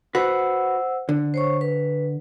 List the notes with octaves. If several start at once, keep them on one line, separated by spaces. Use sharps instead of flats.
F#4 B4 C5 F#5 E6
D3
C5 C#5 C#6
B4